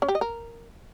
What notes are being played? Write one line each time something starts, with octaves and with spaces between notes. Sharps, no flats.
C#4
G4
D#5
A#4